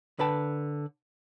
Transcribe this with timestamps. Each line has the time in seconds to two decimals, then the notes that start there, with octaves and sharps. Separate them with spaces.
0.19 D3 B4 G5 A5